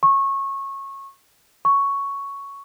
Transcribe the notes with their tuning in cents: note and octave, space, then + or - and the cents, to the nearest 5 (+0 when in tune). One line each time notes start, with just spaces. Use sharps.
C#6 -20
C#6 +5